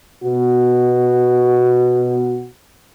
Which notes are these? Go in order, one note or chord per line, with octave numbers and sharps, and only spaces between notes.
B2 F#4